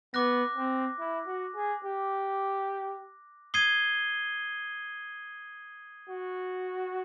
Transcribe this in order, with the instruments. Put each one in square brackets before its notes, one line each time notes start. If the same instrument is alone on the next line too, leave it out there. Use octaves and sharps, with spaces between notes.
[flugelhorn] B3 [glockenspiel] D6 F#6 A#6
[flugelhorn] C4
E4
F#4
G#4
G4
[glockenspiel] D#6 G#6 C7 D#7 G7
[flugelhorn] F#4